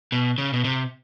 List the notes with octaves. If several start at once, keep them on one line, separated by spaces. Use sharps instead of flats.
B2
C#3
B2
C3